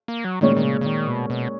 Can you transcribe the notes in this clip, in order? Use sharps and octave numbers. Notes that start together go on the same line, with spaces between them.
A#3
F#3
A#2 D#3 G#3 C#4
D#3
C#3
C#3
D#3
B2
B2